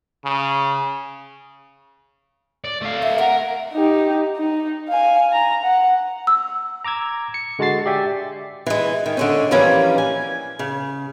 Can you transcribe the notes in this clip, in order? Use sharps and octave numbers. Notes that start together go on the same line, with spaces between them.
C#3
D5
A3 F5
E5
A#4 F#5
D#4 G4
D#4
F5 G#5
A#5
F#5
E6
A#5 D6 E6 G#6
C#7
D3 G#3 F#4 A5 A6 C7
G4 D5 E5 G5 G#5
E3 G#3
D#3
D3 G#3 C#4
E3 F3 G3 A#3 C#4 B4
G#5
C#3